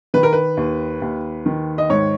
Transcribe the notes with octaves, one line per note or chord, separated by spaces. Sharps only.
D#3 B4
A#4
B4
D#2
D#2
D#3
D#5
G#2 C#5